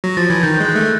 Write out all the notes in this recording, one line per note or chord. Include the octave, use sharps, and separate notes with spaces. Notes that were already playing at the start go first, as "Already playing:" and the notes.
F#3 A#6
F3 A6
E3 G#6
D#3 G6
G#3 F#6
A3 F#6